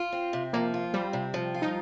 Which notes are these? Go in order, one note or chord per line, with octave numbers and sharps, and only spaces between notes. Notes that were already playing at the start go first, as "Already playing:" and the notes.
Already playing: F4
C4
C3
F3 A#3
F4
G3 C4
C3
F3
F4
D#4